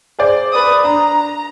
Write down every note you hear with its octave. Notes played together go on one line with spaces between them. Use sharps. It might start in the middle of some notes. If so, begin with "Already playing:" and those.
G#4 C5 D5
B4 D#6
D4 A#5